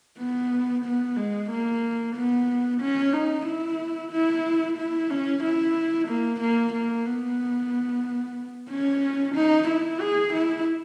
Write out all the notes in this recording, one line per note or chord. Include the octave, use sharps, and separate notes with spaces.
B3
B3
G#3
A#3
B3
C#4
D#4
E4
E4
E4
C#4
E4
A#3
A#3
A#3
B3
C#4
D#4
E4
G#4
E4